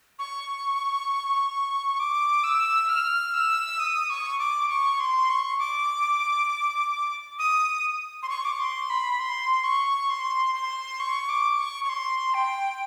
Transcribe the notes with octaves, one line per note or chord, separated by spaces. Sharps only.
C#6
D6
E6
F6
E6
D#6
C#6
D6
C#6
C6
C#6
D6
D#6
C6
C#6
D6
C#6
C6
B5
C6
C#6
C6
C6
C#6
D6
C#6
C#6
C6
G5